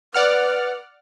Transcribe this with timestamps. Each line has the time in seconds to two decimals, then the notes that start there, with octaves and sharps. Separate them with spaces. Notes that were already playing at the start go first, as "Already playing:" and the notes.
0.14 B4 D5 F#5 F6